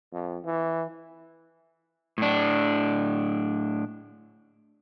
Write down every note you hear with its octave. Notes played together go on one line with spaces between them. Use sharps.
F2
E3
A2 D4